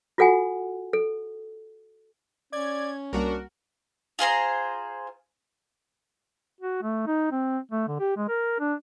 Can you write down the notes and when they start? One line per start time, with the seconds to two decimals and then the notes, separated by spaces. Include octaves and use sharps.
0.18 F4 F#4 A4 F#5 G#5
0.93 A4
2.53 C#4 D5 G#6
3.13 C2 G3 A#3 D4 F#4 A#4
4.19 F4 G#4 C5 A#5
6.60 F#4
6.82 A3
7.07 D#4
7.31 C4
7.71 A3
7.87 D3
8.00 G4
8.17 G#3
8.29 A#4
8.60 D4